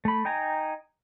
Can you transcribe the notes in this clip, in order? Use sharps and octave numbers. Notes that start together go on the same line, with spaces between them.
A3 B5
D#4 G5 G#5 A#5